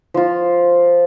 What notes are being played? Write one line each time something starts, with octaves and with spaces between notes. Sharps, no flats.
F3 F4